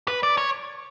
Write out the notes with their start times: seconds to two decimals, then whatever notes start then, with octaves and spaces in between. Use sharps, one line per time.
0.08 B4
0.23 D5
0.38 C#5